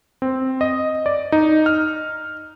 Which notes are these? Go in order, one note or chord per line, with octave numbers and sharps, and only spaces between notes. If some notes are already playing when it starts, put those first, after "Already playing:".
C4
D#5
D5
D#4
F6